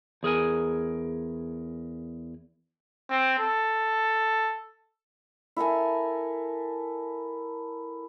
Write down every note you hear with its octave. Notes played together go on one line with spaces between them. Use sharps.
E2 G#4 A#4 G#5
C4
A4
E4 A4 A#4 G#5